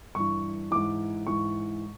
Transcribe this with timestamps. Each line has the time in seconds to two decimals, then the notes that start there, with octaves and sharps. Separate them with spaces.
0.15 G2 E3 C#6
0.71 G#2 E3 D6
1.27 G#2 E3 C#6